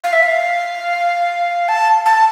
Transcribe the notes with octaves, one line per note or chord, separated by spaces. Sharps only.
F5
E5
F5
A5
A5